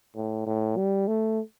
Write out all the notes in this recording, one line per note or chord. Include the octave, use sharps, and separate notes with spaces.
A2
A2
G3
A3